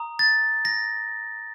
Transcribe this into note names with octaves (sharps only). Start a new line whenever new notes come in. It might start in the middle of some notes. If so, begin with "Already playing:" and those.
Already playing: A#5 D#6
A6
A#6